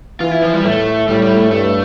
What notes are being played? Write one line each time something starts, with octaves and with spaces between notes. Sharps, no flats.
E3 F4
E4
F3
G3
A2 A3
A2 G3
G3
A3
G2 A3